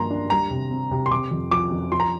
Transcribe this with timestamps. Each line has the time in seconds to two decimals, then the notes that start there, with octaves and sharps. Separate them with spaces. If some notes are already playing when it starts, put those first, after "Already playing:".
Already playing: G2 F3 A#3 A#5 C6
0.10 D4
0.30 G3 A#5
0.51 C3
0.71 C4
0.91 C3
1.06 C6
1.11 C3 D6
1.31 F2
1.51 F3 D6
1.71 F2
1.92 F3 C6
2.00 A#5